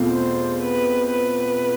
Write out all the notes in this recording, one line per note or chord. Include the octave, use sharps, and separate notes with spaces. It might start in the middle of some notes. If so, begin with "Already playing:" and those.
Already playing: E2 B2 A3 C4 F4
C5
B4
B4